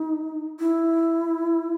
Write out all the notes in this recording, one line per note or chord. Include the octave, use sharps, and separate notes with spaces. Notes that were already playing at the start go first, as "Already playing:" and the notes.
Already playing: D#4
E4